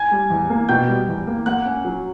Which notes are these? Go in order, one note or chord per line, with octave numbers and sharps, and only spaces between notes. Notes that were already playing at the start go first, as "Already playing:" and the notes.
Already playing: G#5 G#6
G3
E2
A#3
B2 G5 G6
G3
E2
A#3
A#3 F#5 F#6
C#4
F#3